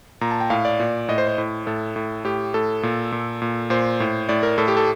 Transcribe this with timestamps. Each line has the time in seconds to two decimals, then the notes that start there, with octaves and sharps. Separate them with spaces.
0.21 A#2 A#5
0.31 A5
0.40 G5
0.50 A2 F5
0.65 D5
0.80 A#2
1.08 A2 D#5
1.18 C5
1.28 C5
1.38 A2
1.67 A2 A4
1.96 A2
2.24 A2 G4
2.54 A2 A4
2.83 A#2
3.12 A#2
3.42 A#2
3.70 A#2 C5
4.00 A2
4.29 A2 D5
4.43 A#4
4.58 A2 A4
4.68 G4
4.77 A4